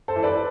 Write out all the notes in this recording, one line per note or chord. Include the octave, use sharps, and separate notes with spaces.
A4 C5
E3
B4 D5